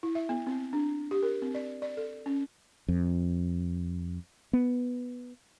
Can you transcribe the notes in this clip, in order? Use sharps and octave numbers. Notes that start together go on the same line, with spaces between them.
E4
E5
B3
C4
D4
G4
A#4
C4
D5
D5
A4
C#4
F2
B3